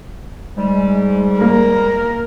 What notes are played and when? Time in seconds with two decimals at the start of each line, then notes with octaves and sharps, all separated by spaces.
0.56 G#2 G3 G#3
1.41 A#3 A#4